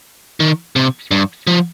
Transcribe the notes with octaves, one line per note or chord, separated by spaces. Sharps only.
D#3
C3
G2
F3